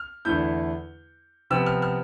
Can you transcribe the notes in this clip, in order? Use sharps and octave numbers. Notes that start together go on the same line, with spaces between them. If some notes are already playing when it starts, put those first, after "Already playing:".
Already playing: F6
E2 D3 A3 E4 G6
C3 F3 B3 E6
F6
F6